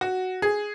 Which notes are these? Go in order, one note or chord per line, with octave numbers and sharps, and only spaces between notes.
F#4
G#4